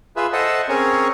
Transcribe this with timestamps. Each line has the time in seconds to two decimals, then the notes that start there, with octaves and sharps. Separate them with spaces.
0.16 F4 G#4 B4 E5
0.33 A4 C5 D#5 E5 F#5 A5
0.69 C4 C#4 G#4 A#4 C#5